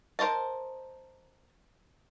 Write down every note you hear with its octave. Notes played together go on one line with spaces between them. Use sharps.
A#4 C5 D#5 A5